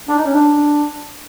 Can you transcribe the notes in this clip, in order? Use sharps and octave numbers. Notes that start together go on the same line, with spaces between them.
D4
D#4
C#4
D4